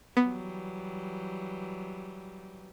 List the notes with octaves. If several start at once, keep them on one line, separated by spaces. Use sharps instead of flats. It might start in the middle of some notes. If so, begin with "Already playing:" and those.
E3 F#3 G3 B3